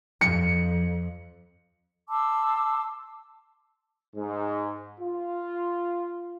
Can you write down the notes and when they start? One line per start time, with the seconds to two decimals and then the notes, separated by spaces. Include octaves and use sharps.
0.21 F2 C#7
2.09 A5 C6 D6 E6
4.16 G#2
5.00 F4